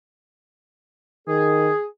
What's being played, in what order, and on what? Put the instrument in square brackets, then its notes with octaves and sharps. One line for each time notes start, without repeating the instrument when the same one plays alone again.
[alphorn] D#3 [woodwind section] G#4